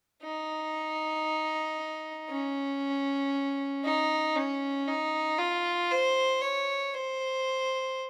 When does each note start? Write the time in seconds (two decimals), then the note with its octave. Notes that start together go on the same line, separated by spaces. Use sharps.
0.23 D#4
2.30 C#4
3.85 D#4
4.36 C#4
4.88 D#4
5.38 F4
5.91 C5
6.41 C#5
6.94 C5